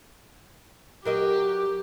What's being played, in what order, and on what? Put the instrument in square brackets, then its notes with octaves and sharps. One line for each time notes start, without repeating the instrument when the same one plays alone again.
[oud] F#3 A#4 D#5 [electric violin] G4